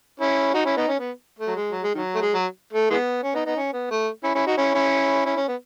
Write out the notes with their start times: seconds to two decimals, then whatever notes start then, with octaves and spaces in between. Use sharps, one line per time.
0.20 C#4 E4
0.53 D#4 F#4
0.65 C#4 E4
0.76 B3 D#4
0.88 C#4
0.99 B3
1.39 A3
1.47 F#3
1.55 G#3
1.71 F#3
1.83 G#3
1.95 D#3 F#3
2.15 A3
2.22 G#3
2.34 F#3
2.73 A3
2.90 E3 G#3 B3
3.23 C#4
3.34 B3 D#4
3.46 B3 D#4
3.56 C#4
3.73 B3
3.91 A3
4.24 C#4 E4
4.35 C#4 E4
4.47 D#4 F#4
4.57 C#4 E4
4.74 C#4 E4
5.25 C#4 E4
5.37 C#4
5.48 B3